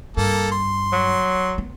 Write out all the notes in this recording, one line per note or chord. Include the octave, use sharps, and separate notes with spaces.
G2 A#3 A4
C6
F#3
B3